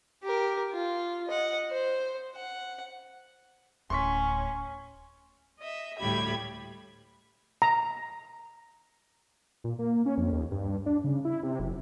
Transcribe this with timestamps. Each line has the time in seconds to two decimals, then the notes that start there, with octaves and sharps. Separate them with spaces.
0.24 G4 A#4
0.73 F4
1.27 D#5 F#5
1.71 C5
2.36 F#5
3.90 D1 C#4 C6 C#6 B6
5.60 D#5 E5
5.98 D2 A2 G3 G4 B5 G#6
7.62 A#5
9.64 A#2
9.79 A#3
10.06 C#4
10.18 F2
10.32 D#2
10.51 G2
10.86 D4
11.04 C#3
11.25 E4
11.43 C3
11.60 F#1